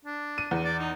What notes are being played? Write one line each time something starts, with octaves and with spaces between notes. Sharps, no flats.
D4
D#7
E2
D5
D#4